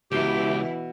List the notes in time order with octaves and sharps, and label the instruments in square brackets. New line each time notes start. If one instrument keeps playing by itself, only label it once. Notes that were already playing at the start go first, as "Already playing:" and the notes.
[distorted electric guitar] C#2 [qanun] B2 [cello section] E3 E4 [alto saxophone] G4